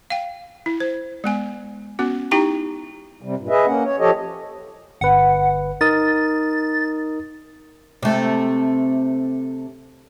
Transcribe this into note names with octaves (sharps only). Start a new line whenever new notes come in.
F5 G5
E4
C5
G#3 B3 G#5
B3 C#4 F#4
D#4 E4 G4 G5 A#5 C#6
C3 G3
G2 A#2
G#4 B4 D#5 E5
A#3 C#4 F#5
C#5
F3 G4 A4 C#5 D#5
G1 B4 F#5
D#4 A#4 D#6 A6
C3 A3